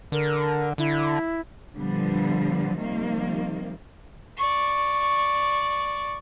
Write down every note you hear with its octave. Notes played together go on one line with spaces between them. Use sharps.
D3 A#4
D3 E4
A#2 D3 F3 G3 B3
C3 D#3 F3 G3 A#3
D5 C#6